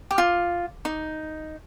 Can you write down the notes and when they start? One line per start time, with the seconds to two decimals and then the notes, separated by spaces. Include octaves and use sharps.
0.11 G4
0.18 F4
0.85 D#4